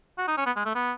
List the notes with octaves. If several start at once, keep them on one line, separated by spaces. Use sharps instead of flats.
F#4
D#4
C#4
B3
G#3
A3
B3